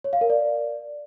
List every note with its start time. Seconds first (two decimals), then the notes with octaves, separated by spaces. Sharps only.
0.04 C#5
0.13 F5
0.21 A#4
0.30 D5